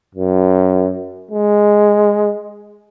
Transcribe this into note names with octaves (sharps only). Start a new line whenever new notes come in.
F#2
G#3